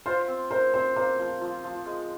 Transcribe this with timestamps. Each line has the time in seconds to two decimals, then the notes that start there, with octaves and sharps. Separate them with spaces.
0.06 F4 C5
0.28 C4
0.51 A#4 C5
0.74 C4 C5
0.96 A#3 C5
1.19 F3
1.41 F3
1.64 F3
1.86 G#3